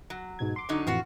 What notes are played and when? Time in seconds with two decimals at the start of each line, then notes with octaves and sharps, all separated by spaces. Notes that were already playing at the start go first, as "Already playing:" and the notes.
0.10 F#3
0.39 G#2 B2 G#6
0.56 C6 D6
0.69 D3 F#3 D#4
0.87 F2 A2 E3 F4 F#4 F#5